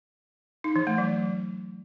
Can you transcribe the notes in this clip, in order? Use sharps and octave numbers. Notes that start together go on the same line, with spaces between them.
D#4
E3
A3
F#3